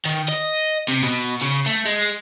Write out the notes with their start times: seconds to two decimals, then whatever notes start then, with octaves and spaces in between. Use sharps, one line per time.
0.05 D#3
0.29 D#5
0.88 C3
1.03 B2
1.41 C#3
1.66 A3
1.86 G#3